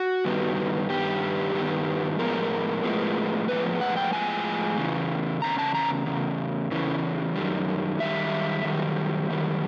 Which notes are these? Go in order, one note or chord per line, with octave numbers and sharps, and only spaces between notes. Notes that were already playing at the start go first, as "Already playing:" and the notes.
Already playing: F#4
G2 D#3 G3 B3
G2 D#3 G3 B3 G4
G2 D#3 G3 B3
A2 F3 G#3 B3 A#4
A2 F3 G#3 B3
A2 F3 G#3 B3 B4
F#5
G5
A2 F3 G#3 B3 G#5
E2 C#3 E3
E2 C#3 A#5
A5
A#5
E2 C#3
E2 C#3 E3
F#2 D#3 G3
F#2 D#3 G3 E5
F#2 D#3 G3
F#2 D#3 G3